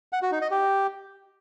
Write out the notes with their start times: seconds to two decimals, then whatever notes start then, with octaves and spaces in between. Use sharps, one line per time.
0.13 F#5
0.22 F#4
0.32 D#4
0.41 D#5
0.51 G4